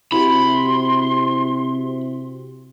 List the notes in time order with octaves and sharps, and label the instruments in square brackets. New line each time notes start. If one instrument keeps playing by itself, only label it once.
[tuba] C3 [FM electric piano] E4 F#4 G4 [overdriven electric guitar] B5 [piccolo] C6